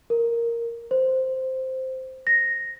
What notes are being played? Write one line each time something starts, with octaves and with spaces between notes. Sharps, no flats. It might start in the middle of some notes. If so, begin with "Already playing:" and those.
A#4
C5
A#6